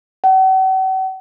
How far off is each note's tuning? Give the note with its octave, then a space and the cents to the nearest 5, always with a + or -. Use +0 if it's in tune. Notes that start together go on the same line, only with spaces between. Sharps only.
F#5 +45